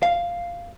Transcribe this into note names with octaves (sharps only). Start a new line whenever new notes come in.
F5